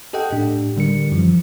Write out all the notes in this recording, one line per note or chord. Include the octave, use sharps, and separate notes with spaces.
G4 A4 D#5 F#5 G5
A2 D4 G4
D3 G3 A#4 C#7
F#2 E3 F3